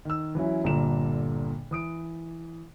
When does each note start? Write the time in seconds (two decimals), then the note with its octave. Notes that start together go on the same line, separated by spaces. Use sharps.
0.05 D#3 E6
0.35 E3 F#3 C#4 E4
0.64 G1 A#2 D3 A#5 E7
1.71 E3 D#6 D7